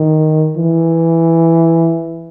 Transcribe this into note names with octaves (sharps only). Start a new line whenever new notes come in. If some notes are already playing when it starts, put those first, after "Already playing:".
Already playing: D#3
E3